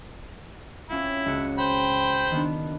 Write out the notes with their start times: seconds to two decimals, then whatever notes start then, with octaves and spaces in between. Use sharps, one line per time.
0.90 C4 C#4 E4 F4
1.26 C#2 F#4 C#7
1.59 C5 G5 B5
2.31 D#3 B3 D4